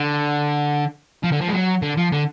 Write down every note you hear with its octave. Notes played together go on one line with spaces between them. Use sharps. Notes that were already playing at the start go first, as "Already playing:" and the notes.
Already playing: D3
F3
D3
F3
G#3
F#3
D3
F3
D3